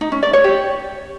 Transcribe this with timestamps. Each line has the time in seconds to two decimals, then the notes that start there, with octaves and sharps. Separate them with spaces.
0.01 D#4
0.12 C#4
0.23 D5
0.33 C#5
0.44 G4